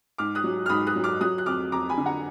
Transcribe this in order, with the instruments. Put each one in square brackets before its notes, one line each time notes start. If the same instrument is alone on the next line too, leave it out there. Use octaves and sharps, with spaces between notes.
[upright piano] G#2 D6 F6
D#6 F#6
F#3
F6
G#2 B5 D#6
D#6 F#6
F#3
D6 F6
F#3 D#6 F#6
F#6
F2 D6 F6
F2 A#5 D6
G#5 B5
D3
F#5 A#5